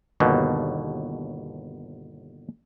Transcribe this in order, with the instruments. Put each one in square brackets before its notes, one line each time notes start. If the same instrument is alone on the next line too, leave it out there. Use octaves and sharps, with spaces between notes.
[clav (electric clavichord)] G1 D#2 B2